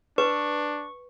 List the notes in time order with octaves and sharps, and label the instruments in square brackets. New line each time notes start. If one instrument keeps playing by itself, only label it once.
[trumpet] D4 [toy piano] B4 [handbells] C#6